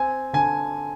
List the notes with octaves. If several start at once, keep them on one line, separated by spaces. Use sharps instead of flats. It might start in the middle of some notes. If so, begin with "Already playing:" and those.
Already playing: C4 G#5
D3 G#5